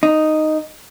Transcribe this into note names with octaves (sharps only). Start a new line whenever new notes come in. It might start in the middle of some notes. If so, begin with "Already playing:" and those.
D#4